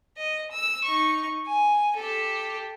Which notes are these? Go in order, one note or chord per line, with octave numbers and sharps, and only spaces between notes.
D#5
E6
D#4 C#6
G#5
G4 A4